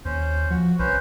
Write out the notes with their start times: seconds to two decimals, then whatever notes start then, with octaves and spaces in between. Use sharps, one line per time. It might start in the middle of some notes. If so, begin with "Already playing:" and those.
0.05 D#2 C#4 C5
0.50 F3 F#4
0.79 C2 C#4 B4 C5